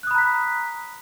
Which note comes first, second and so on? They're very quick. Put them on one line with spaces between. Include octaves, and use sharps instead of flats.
F#6 D#6 B5 A#5 B6